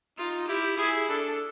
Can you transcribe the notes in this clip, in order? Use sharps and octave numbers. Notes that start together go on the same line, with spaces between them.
D#4 F4
E4 G4
E4 G#4
D4 A4